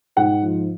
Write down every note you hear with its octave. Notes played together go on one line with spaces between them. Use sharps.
G#2 F#5
F3